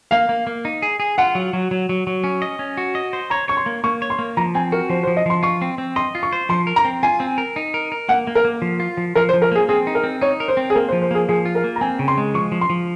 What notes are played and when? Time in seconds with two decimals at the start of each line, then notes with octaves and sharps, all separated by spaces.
0.11 A#3 F5
0.29 A#3
0.47 A#3
0.65 D#4
0.82 G#4
1.00 G#4
1.18 F4 F#5
1.35 F#3
1.53 F#3
1.71 F#3
1.89 F#3
2.07 F#3
2.24 C#4
2.42 D#5
2.59 C#4
2.77 F#4
2.95 D#5
3.13 C5
3.30 C#5 A#5
3.48 C#5 C#6
3.57 C6
3.66 A#3
3.84 A#3 C#6
4.02 C#5
4.10 C6
4.19 A#3
4.37 F3 A#5
4.55 C4 G#5
4.72 F#4 A#4
4.90 F3 C5
5.03 C5
5.07 F3
5.17 D#5
5.26 F3 C6
5.43 F4 C#6
5.62 C4
5.78 C4
5.96 D#5 C6
6.15 F4
6.23 C#6
6.33 C5
6.49 F3 C6
6.67 A#4
6.76 A#5
6.85 C4
7.03 F4 G#5
7.20 C4
7.38 A#4
7.56 D#4
7.74 A#4
7.92 A#4
8.09 A#3 F#5
8.27 A#3
8.35 A#4
8.45 A#3
8.62 F3
8.80 F4
8.97 F3
9.15 F3 A#4
9.29 C5
9.34 F3
9.42 A#4
9.52 A#3 G#4
9.69 C4 G#4
9.87 D#4
9.95 A#4
10.04 C4
10.21 D#4 C#5
10.40 A#4
10.48 C5
10.57 C4
10.70 G#4
10.75 A#3 A#4
10.88 C5
10.92 F3
11.02 C5
11.11 A#3 G#4
11.29 F3 G#4
11.45 F4
11.55 A#4
11.64 A#3
11.76 A#5
11.81 C4 G#5
11.99 C#3
12.08 C6
12.17 G#3
12.34 F3 C#6
12.52 F3
12.61 C6
12.70 F3